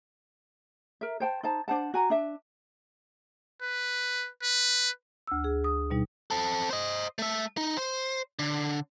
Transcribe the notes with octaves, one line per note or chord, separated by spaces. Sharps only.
A#4 E5
C5 G5 A5
D#4 C5 A5
D4 C5 F#5 A5
F#4 G#5 A#5
D4 E5
B4
B4
D2 E6
G#4
D#6
B2 G3 D#4
C4 A4
C5 D#5
A3 E5
D#4
C5
D3